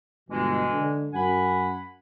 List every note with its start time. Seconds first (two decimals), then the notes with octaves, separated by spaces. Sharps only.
0.29 G1 B2 E3 G#3
0.72 D3
1.14 F#2 F#5 G#5 B5